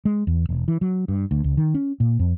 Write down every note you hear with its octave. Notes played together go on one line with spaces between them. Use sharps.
G#3
E2
E1
E3
F#3
G2
D2
C#2
D#3
C#4
A#2
F2